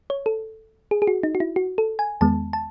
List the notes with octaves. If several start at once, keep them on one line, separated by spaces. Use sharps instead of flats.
C#5
A4
G#4
G#4
F#4
D#4
F#4
E4
F#4
A4
G#5
E2 D#3 G#3 B3 A5
A5